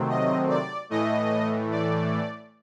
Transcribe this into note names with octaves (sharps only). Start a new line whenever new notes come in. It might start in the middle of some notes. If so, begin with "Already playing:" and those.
Already playing: C3 D#3 F#3 A3 C4
D#5
D5
A2 E3 A3 D#5
D5